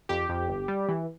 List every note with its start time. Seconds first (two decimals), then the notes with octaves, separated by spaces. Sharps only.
0.09 F2 G4
0.29 F2
0.48 G1
0.68 G3
0.89 E3